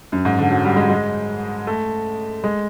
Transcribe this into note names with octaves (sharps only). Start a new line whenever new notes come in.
F#2
G#2
D3
F#3
G3
G#3
G#3
A3
G#3